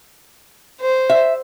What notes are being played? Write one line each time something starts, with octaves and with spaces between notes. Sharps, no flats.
C5
E5